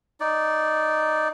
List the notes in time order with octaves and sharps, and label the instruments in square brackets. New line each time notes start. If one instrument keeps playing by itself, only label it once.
[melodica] D#4 D5